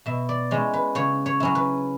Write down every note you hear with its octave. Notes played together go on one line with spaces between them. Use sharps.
B2 E5
D5
G#3 C#4 E4 C#5
B4
C#3 C#5
C#5
F#3 C#4 E4
B4